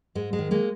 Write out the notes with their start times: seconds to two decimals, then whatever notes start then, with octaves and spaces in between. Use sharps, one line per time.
0.15 G#2 G#3
0.33 G#3
0.39 D#3
0.51 G#3 A#3